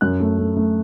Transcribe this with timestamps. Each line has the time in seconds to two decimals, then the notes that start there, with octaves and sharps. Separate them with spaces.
0.01 F#2 F#6
0.20 A3
0.38 A3
0.57 A3